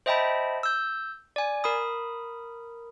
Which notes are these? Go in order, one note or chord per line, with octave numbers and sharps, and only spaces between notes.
C5 D#5 E5 G5 A5 B5
E6 G6
D5 G#5
A#4 B5 D#6